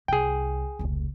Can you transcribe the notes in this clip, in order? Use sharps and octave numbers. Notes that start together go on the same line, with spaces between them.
C2 G#4 G5
F1 C#2